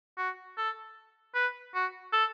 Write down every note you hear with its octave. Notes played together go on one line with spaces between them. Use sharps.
F#4
A4
B4
F#4
A4